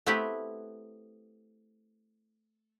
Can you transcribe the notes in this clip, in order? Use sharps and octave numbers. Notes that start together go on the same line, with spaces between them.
A3 B3 C4 E4 G4 B4